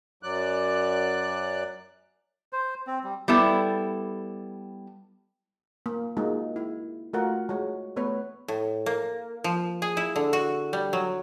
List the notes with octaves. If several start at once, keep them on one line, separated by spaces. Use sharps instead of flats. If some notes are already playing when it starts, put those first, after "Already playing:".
F#2 F#3 D5 F#6
C5
C4
G3
G3 B3 E4 A4
A#3
G#3 A#3 D#4 F4 F#4
E4
A3 F4 F#4 A#4 F#5
G#3 F#4 C#5
A3 B3 B4 C#5
A2
A#3
F3
G#4
E4
D3
F#4
G3
F#3